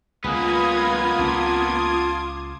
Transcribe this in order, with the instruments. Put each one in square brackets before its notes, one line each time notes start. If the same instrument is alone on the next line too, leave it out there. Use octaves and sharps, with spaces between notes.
[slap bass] C#2 [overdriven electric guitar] A#3 B3 [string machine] F4 D#6 G#6 [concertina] G#4 B4
[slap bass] C#2 C#4 [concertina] A5 C6 D6